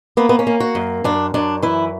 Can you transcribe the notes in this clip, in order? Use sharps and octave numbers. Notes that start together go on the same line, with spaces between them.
A#3 B3
B3
C#4
A#3
F#4
F#2
F#2 D4
F#2 D4
E3 E4